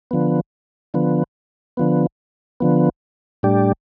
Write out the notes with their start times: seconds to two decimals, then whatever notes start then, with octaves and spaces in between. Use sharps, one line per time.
0.11 D3 F3 B3
0.94 D3 F3 B3
1.77 D3 F3 B3
2.60 D3 F3 B3
3.43 A2 G3 D4 G4